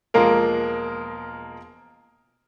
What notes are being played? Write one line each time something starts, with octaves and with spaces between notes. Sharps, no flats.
E1 F3 G#3 A#3 A#4